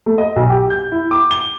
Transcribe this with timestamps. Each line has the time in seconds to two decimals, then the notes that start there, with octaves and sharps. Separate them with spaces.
0.06 A3
0.18 D#5
0.36 B1
0.50 G4
0.70 G6
0.92 E4
1.11 D6
1.31 G7